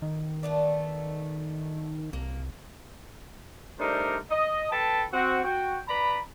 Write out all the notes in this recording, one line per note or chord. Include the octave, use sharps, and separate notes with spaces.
D#3
A3 B3 D5
C2 A#3
G3 A3 D4 D#4 A#4 C5
D#5
A4 B4 G5 A5
C4 F#4
F#4 G5
B4 D5 A#5 B5